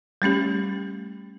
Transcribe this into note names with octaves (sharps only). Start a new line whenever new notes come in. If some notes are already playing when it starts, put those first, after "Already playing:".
G3 A3 C#4 G4